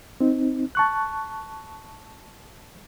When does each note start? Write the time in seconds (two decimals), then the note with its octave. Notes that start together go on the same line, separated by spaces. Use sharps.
0.21 C4 D#4
0.75 A5 C#6 F#6